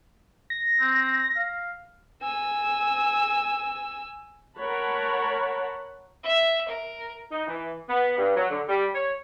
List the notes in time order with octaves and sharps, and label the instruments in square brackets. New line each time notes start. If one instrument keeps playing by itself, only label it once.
[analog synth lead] A#6
[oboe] C4
F5
[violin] G#5 E6
[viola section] A#4 C#5 F#5 A5 B5
[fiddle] E5
A#4
[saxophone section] D#4
E3
B3
G2
F#3
D3
G3
C#5